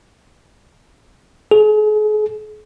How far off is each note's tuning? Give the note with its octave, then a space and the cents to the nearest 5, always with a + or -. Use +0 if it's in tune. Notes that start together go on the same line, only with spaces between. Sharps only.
G#4 +40